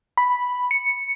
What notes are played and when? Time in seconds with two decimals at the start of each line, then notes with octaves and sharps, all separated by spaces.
0.17 B5
0.71 C#7